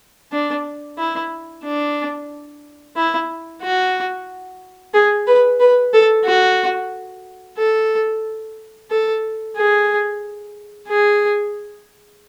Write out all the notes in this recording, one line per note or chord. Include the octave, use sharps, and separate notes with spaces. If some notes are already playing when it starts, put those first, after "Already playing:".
D4
E4
D4
E4
F#4
G#4
B4
B4
A4
F#4
A4
A4
G#4
G#4